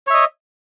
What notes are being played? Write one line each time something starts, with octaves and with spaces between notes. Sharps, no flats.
C#5 D#5 E5